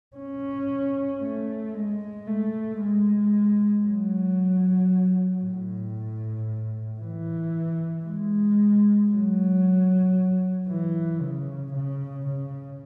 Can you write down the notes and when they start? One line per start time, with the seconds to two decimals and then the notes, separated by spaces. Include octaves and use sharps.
0.16 C#4
1.21 A3
1.74 G#3
2.27 A3
2.79 G#3
3.85 F#3
5.42 A2
7.00 E3
8.05 G#3
9.11 F#3
10.68 E3
11.21 C#3
11.73 C#3
12.26 C#3